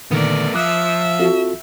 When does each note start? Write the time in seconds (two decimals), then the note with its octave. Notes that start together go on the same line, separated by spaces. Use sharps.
0.11 A#2 D3 D#3 A3 B3 A#4 D5
0.54 F3 E5 D6 D#6 F#6
1.20 C4 F4 F#4 A4